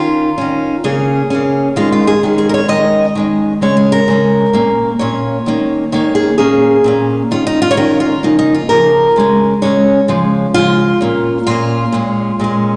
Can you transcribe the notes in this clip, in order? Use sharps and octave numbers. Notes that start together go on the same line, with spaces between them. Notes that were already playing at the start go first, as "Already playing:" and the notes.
Already playing: D#3 C#4 F4
D#3 C#4
C#3 A#3 C#4 G#4
C#3 A#3 C#4
D#3 G#3 C#4 F4
F4
G#4
D#3 G#3 C#4
G#4
A#4
C#5
D#3 G#3 C#4 D#5
D#3 G#3 C#4
C#3 G#3 C#4 C#5
G#4
A#4
C#3 G#3 C#4
A#2 A#3 C#4
A#2 A#3 C#4 C#5
D#3 A#3 C#4
D#3 A#3 C#4 C#5
G#4
A#2 A#3 C#4 G#4
A#2 A#3 C#4
D#3 C#4 F4
D#4
F4
C#5
D#3 C#4 A#4
F4
C#3 F3 A#3 D#4
D#4
F4
C#3 F3 A#3 A#4
C#3 G#3 C#4
C#3 G#3 C#4 C#5
C#3 F3 G#3
C#3 F3 G#3 F4
A#2 A#3 C#4
A#2 A#3 C#4 F4
A#2 G#3 C#4
A#2 G#3 C#4